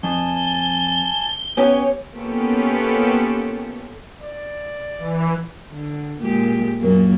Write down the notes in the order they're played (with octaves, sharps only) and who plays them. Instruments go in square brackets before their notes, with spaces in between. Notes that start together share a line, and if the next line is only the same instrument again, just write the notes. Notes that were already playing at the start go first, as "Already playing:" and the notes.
[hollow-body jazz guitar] F2 [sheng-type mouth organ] G#5 A5 [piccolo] G7
[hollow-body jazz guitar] B3 C#4 G4 [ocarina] C#5 [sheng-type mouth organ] G5 G#5
[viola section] A#3 B3 C#4 F4 G4 A4
[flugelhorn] D5
[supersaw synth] E3
[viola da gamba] D3
A#2 G#3 G4
F#2 A#2 A#3